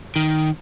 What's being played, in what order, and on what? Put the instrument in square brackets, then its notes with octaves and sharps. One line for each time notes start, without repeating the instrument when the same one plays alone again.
[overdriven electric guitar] D#3